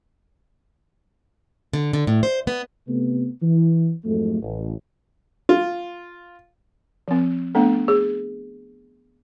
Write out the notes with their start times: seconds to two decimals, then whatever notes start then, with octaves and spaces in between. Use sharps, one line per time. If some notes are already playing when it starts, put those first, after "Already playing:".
1.73 D3
1.93 D3
2.07 A2
2.23 C5
2.47 B3
2.88 C3 A3 B3
3.42 E3
4.05 F2 G#2 F#3 A3
4.42 A1
5.49 F4
7.08 F3 C4
7.55 A3 B3 D4 A4
7.88 G#4